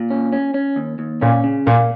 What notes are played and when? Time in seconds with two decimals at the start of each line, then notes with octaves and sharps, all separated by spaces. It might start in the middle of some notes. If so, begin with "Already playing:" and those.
Already playing: A#2
0.10 C#4
0.33 C#4
0.54 C#4
0.76 D#2
0.99 D#2
1.21 A#2 C#4
1.44 C#3
1.66 A#2 A#3